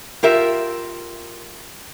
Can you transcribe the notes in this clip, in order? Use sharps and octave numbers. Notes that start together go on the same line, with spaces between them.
F4 G4 A#4 E5